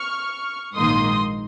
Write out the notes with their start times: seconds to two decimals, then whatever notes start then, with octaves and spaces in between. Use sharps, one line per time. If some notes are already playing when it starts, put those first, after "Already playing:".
Already playing: C#6 F6
0.75 A#1 G#2 D#3 A#3 D#4 C6 D#6